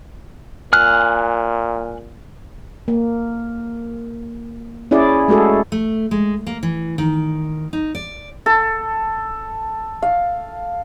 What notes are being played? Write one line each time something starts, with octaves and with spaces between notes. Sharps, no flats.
A#2 G#5 F6 F#6
A#3
C#4 E4 G#4 D5
G#3 A3 F#4 G#4 A4
A3
G#3
A#3
E3
D#3
D#4
D5
A4
F5